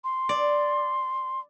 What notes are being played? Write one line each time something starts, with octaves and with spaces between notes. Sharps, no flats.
C6
D5